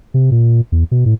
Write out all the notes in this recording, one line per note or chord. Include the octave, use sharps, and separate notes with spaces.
C3
A#2
E2
B2
A2